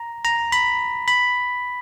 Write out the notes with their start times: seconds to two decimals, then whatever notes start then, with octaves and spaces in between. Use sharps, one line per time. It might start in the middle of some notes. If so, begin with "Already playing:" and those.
Already playing: A#5
0.25 A#5
0.52 B5
1.08 B5